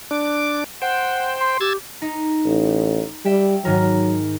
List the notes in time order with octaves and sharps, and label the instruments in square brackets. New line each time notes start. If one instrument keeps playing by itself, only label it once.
[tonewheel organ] D4 D6
[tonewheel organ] C5 G5 [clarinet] F#5
[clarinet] C6
[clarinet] G4 [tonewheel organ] E6 G#6 A6
[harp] D#4
[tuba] A1
[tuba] G3 [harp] E5 G5
[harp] G#2 D#3 A#4 [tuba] F#3